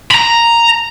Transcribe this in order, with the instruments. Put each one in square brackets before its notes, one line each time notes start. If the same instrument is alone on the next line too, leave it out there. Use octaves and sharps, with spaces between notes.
[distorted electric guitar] A#5 B5